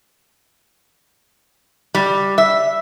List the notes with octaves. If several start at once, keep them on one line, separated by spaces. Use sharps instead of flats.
G3
E5